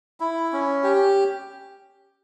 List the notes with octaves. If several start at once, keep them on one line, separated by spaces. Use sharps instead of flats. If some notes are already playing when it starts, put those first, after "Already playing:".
E4
C#4
G4